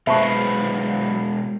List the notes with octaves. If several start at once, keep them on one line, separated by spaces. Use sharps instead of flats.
B2 F#3 G#3 B4 C5 E5 A5 C#6